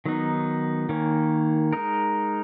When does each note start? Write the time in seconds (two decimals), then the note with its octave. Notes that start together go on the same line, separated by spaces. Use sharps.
0.06 D#3 F#3 B3 D#4
0.89 D#3 A#3 C#4
1.73 G#3 D#4 A#4